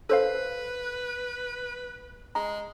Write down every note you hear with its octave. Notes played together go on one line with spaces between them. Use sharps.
A4 B4 C5 F5
G#3 A#5